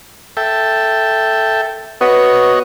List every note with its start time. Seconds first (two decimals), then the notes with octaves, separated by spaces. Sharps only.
0.37 A4 E5 G5
2.01 B3 F#4 C#5 D#5